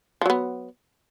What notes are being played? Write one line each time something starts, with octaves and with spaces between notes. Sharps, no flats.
F3 F#3 B3